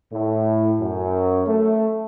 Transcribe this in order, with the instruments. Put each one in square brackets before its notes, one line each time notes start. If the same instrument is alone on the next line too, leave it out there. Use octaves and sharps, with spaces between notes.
[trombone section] A2
F#2
A3